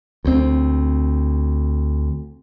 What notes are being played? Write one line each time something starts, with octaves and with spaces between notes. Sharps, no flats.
D2 C4